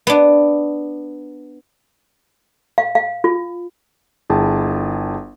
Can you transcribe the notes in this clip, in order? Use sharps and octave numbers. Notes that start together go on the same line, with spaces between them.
B3 D4
F5
F5
F4
G1 E4 G#4 G5 A5